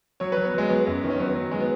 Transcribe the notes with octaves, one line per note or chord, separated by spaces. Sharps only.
F#3 C#5
F#3 B4
B3
F#3 G#3
F#3 B3
F#2
D#3
C#4
F#3 B3
F#3
F#3 G#3
B3